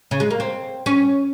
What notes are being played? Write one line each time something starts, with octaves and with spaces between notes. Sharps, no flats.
C#3
G#3
A#3
C4
C#4